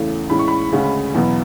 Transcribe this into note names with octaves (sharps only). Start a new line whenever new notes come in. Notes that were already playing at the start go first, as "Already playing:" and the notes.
Already playing: E2 C#3 E3 A3 C#4
A2 E3 G#3 C#4 B5
C#6
B5
D2 C#3 G#3 C#4
E2 B2 F#3 B3